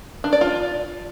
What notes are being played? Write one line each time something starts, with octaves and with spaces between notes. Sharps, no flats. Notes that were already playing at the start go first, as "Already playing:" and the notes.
D4
D5
F4